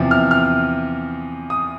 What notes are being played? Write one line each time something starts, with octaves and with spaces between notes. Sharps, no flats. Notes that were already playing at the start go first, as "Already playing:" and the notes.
Already playing: E2 C3 F3
F6
F6
D#6